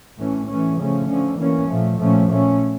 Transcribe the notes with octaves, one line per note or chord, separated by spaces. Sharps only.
A2 E3 A3 C#4
E3 A3 C#4
C#3 F3 A3 C#4
D3 F3 C#4
E3 A#3 C#4
A#2 F3 A3
A#2 F3 A3 C#4
A#2 A3 C#4